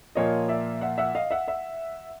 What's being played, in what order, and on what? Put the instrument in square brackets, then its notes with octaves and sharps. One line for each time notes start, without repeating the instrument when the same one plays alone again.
[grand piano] A#2 F3 A#3 C#5 D#5
D5 E5
E5 F#5
E5 F#5
D#5 F5
E5 F#5
E5 F#5